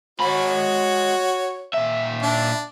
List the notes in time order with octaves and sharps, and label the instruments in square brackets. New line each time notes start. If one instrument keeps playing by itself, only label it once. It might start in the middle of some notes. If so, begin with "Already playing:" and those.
[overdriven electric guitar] G#3 B5 [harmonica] F#4 C#5
[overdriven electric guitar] A#2 E5
[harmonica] D4